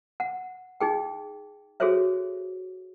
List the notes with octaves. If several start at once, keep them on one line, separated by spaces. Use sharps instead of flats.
F#5
D#4 G#4 G5
F#4 G#4 A4 C5 C#5 E5